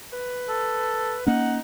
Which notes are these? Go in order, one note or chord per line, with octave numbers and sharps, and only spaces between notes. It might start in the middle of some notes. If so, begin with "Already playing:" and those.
B4
A4
A#3 C#4 D#4 F#5